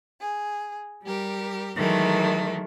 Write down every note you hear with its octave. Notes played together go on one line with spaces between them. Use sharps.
G#4
G3 G4 A#4
D#3 E3 F#3 G#3 A3 A#4